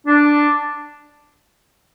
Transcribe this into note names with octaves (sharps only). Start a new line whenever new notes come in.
D4